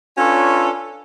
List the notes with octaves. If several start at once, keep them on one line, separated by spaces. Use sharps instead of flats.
C#4 D4 F4 A4 B4 C#5